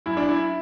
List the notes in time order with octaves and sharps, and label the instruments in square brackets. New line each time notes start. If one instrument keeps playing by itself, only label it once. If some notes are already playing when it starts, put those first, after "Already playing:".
[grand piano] F#2 E4
D4
E4